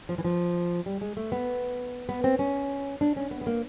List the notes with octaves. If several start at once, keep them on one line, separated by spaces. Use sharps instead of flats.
F3
E3
F3
G3
G#3
A3
B3
B3
C4
C#4
D4
C#4
B3
B3
A#3